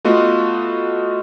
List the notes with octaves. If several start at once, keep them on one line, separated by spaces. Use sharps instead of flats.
A3 B3 F4 F#4 D#5